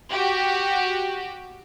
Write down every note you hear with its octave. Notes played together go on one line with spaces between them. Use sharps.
F#4 G4